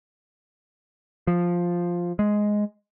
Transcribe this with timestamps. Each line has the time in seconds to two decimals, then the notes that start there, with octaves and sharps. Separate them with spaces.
1.27 F3
2.19 G#3